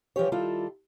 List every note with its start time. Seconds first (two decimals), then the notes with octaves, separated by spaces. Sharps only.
0.16 E3 F3 G3 G4 C#5
0.32 D#3 G3 E4 F4 A4